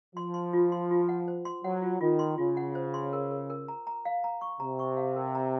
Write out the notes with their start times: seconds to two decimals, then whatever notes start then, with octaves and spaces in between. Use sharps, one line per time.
0.15 F3 C6
0.34 C6
0.53 F4
0.72 C6
0.91 F4
1.09 F#5
1.28 C5
1.45 C6
1.64 F#3 F#5
1.82 F4
2.01 D#3 F4
2.19 C6
2.38 C#3 F4
2.57 F#5
2.75 C5
2.94 C6
3.13 A#4
3.31 A#4
3.50 A#4
3.68 A#5
3.87 A#5
4.05 F5
4.24 A#5
4.41 C#6
4.60 C3 A#5
4.79 C#6
4.97 F5
5.16 A#4
5.35 A#5